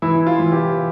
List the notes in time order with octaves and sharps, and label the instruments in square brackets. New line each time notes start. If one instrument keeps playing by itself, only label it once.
[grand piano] E3 E4
F4
E3
G4